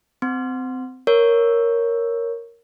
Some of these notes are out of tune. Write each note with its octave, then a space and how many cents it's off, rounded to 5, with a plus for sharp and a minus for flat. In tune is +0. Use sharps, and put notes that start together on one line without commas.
C4 -25 C6 +0
A#4 +0 C#5 +0